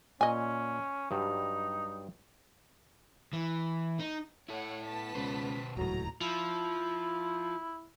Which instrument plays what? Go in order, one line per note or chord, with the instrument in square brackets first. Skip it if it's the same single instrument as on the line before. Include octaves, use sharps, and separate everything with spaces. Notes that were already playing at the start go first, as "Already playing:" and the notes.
[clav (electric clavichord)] A#2 [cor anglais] C#4 [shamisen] D#5 G#5
[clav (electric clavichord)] G2 F#3 G3 [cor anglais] D#4
[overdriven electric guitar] E3
D#4
[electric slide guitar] E4 A4 [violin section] C#5 F#5
[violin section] B3 A5 B6
[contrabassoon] C#2 [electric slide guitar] B2 B4 C5
[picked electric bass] D#1 C#2 A2 [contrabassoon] F#3 [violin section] A#5
[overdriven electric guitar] F3 [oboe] E4